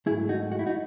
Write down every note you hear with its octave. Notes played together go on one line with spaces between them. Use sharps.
G#2 F#3 A3 E4 G#4
D#4 F#4
F#4
E4
D#4 F#4